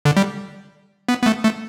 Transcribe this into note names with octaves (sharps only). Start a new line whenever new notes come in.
D3
G3
B3
B3
A3
A3